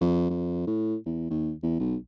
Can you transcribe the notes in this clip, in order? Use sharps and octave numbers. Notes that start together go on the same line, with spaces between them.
F2
F2
A2
E2
D#2
E2
B1